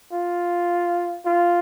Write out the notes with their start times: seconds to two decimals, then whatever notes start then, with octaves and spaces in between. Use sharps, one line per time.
0.13 F4
1.26 F4